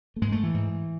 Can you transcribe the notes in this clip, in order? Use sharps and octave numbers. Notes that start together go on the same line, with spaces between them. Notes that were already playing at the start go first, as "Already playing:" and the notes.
A3
G#2 G#3
A3
E3
G#2